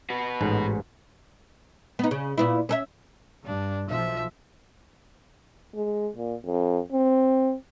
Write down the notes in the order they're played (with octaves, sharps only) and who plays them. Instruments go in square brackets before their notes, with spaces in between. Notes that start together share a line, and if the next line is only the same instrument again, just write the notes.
[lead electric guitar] F#4 B4
[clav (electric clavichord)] A1 G#2
[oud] B3 D#4
C#3
A#2 B3 E4
C#4 A4 E5
[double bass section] G2 [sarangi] D4
[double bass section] B1 F3 [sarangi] E5
[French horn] G#3
A#2
F2
C4